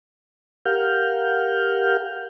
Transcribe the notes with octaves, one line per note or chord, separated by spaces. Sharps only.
G4 A#4 F5 F#5 F6 G6